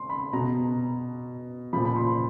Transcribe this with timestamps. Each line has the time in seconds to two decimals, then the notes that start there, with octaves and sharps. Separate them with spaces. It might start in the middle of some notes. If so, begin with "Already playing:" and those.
Already playing: C6
0.09 B5
0.33 B2 A#5
1.73 F3 B5
1.76 A#2
1.85 B5
1.96 C6